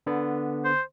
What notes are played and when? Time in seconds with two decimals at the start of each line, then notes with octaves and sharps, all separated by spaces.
0.07 D3 B3
0.64 C5